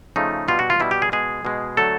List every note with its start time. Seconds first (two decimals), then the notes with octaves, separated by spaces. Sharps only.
0.16 C#3 F3 A3 D#4
0.48 B2 G3 F4
0.59 F#4
0.70 F4
0.80 B2 G3 E4
0.91 G4
1.02 G#4
1.12 B2 G#3 G#4
1.45 B2 G#3
1.77 D3 F#3 A3 A4